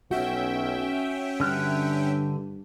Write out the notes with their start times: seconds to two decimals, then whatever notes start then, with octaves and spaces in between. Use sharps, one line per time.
0.11 B1 C#4 F#4 E5 G5
1.40 G2 D3 F6 F#6